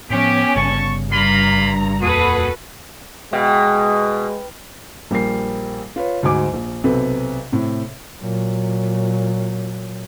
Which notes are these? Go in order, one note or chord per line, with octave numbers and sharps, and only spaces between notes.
A2 F3 B3 C#4 G4
G1 C#3 G3 A5 C#6
G2 A#3 F4 A#5 B5
D#1 F2 A#3 F#4 G#4 A4 B4 D#6
B2 G#3 F5 G5
A#1 G3 A#4 C7
F4 B4 C#5
D2 G#2 F#4 G#5 D6
A#1
B1 C3 A4 B4
A2 C3
A#2 F#3